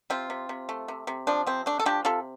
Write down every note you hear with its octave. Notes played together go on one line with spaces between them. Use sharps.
C3 C4 F4
C3
C3
A3
C3
C3
F3 D4
C3 C4
A3 D4
A4
F3 D4 G4
C3 F4 A4